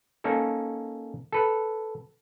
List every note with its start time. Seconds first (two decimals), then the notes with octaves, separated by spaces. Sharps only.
0.24 A#3 C#4 D#4 A4 A#4
1.32 A4 B4